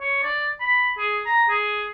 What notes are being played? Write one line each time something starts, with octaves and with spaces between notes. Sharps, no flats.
C#5
D5
B5
G#4
A#5
G#4